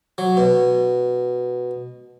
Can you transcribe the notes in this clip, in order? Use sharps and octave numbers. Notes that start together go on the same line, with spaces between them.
F#3
B2